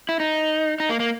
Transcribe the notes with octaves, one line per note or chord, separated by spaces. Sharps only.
E4
D#4
D#4
A#3
A#3